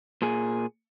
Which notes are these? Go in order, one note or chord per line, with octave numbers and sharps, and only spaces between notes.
A#2 G#4